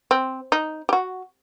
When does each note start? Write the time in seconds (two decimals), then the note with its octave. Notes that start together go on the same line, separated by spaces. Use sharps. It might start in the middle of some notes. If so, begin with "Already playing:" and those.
0.11 C4
0.52 D#4
0.89 G4
0.93 F#4